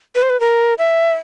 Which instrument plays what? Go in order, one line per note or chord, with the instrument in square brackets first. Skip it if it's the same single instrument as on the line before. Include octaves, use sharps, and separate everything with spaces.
[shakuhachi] B4
C5
B4
A#4
E5